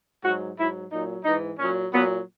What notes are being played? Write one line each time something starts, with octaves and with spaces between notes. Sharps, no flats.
G#2 F#3 F#4
G#2 F#3 E4
A#2 F#3 D#4
G#2 E3 D#4
A#2 F#3 C#4
A#2 F#3 B3